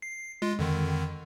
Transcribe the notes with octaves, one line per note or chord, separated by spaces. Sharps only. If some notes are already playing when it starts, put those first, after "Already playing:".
C7
G#3 F4
F2 D3 D#3